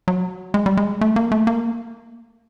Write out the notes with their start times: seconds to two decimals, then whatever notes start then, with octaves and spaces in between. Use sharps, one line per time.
0.08 F#3
0.54 G#3
0.66 G3
0.77 G#3
1.01 A3
1.16 A#3
1.32 A3
1.47 A#3